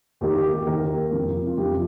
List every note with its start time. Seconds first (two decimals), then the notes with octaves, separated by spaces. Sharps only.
0.21 D#2 D#3 G4
0.36 G4
0.51 G4
0.67 D#2 D#3 A#4
1.11 F2 C3 F3
1.46 F4
1.57 F2 C3 F3 G4